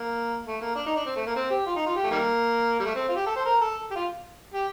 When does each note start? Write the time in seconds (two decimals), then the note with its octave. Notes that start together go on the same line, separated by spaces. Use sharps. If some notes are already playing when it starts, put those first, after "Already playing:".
Already playing: A#3
0.46 A3
0.61 A#3
0.75 D4
0.86 D#4
0.96 D4
1.06 C4
1.16 A3
1.26 A#3
1.36 C4
1.50 G4
1.67 F4
1.76 D#4
1.86 F4
1.96 G4
2.04 A3
2.11 D#3 G3 A#3
2.80 G3
2.85 A3
2.95 C4
3.09 F4
3.16 G4
3.26 A4
3.36 C5
3.45 A#4
3.61 A4
3.91 G4
3.96 F4
4.54 G4